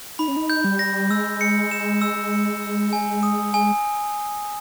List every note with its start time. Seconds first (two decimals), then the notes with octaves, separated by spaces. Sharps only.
0.19 D#4 B5
0.28 C#4
0.37 D#4
0.50 G6
0.65 G3
0.79 A#6
1.10 G#3 E6
1.41 C#7
1.71 E7
2.01 E6
2.32 C#7
2.62 E6
2.93 G#5
3.23 D#6
3.54 G#5